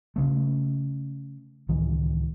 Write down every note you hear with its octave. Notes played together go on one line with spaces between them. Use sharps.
C#3 A3
C#2 A2 D#3 E3